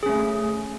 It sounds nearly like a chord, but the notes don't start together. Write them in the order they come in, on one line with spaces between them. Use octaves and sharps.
G#4 C#4 A3